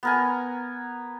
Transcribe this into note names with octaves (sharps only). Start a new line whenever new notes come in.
B3 A#4 G#5